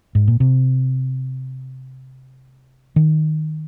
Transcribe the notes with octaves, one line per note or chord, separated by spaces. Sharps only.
G#2
A#2
C3
D#3